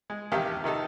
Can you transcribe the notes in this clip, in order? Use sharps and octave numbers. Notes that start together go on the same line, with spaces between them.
G#3
A1 C3 D#3 G4 F5
C3 D#3 D#4 A4